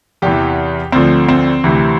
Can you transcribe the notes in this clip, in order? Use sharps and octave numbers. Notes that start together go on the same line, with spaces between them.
E2 C3 E3 G4
D2 D3 F3 C4
C4
D2 C3 E3